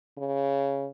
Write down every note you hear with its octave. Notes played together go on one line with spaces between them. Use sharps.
C#3